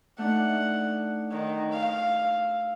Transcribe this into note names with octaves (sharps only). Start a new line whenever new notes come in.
A3 D4 D#4 F#5
D#3 C#5
F5
E6